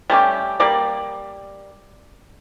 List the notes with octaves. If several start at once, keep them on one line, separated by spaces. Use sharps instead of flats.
G3 A3 C#4 G4
G3 A#3 D5